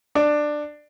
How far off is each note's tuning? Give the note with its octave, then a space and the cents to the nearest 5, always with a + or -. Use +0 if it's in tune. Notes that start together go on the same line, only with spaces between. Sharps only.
D4 +15